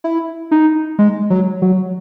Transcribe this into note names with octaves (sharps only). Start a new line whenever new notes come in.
E4
D#4
G#3
F#3
F#3